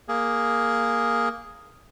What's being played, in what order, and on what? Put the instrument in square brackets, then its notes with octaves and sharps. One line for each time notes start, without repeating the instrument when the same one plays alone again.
[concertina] A#3 G#4